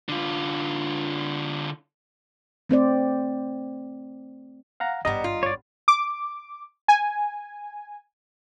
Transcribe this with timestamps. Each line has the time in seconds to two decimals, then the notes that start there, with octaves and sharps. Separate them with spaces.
0.09 D3 F4
2.69 A3 C4 C5 D5
4.80 F5 F#5 A#5
5.05 G#1 G2 G3 B3 D#5 A#5
5.24 F4
5.43 C#5 D5
5.88 D6
6.88 G#5